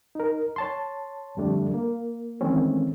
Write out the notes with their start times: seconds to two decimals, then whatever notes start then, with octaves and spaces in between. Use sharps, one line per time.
0.15 D#4 A#4
0.56 C#5 A5 C6
1.37 F2 D3 G3 A3 D4
1.74 A#3
2.41 D#3 E3 G#3 A3 C4 C#4